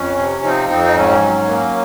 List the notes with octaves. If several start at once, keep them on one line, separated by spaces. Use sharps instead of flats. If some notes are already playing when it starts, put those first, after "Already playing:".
Already playing: F2 C#4
C3
F3 C4 D#4
F2 C4 D#4
D#4
G#2 C#4
F#3
A#3